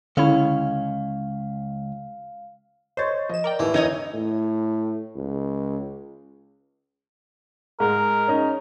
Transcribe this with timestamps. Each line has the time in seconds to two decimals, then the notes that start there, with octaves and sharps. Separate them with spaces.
0.17 C#2 D3 C#4 E4 F5
2.97 C5 C#5 D#5 A6
3.29 F3 D#5 E7
3.44 A#4 D5 G5
3.59 D#2 A2 E3
3.74 E2 D#3 D#4 C#5 D#5 G#5
4.14 A2
5.16 C#2
7.80 G#2 G#3 A#4
8.28 C#4 D#4